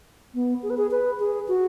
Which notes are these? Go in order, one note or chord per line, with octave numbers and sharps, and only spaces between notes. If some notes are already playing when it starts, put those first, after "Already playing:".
B3
G#4
B4
G#4
B4
G#4
F#4